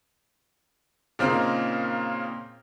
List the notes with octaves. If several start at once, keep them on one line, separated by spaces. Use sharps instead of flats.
A#2 C#3 A#3 C4 D#4 A#4